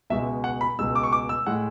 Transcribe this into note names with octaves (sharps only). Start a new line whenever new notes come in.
C#2 B2 G#3 E5
F#5
B5
C#2 B2 G#3 E6
D6
C#6
D6
E6
A2 G#3 F#5